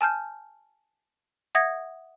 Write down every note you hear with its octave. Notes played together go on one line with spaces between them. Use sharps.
G#5 A5 F6 G6
E5 F#5 D#6 G#6 A#6